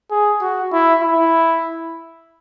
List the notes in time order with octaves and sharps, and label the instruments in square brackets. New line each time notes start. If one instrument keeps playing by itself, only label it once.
[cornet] G#4
F#4
E4
E4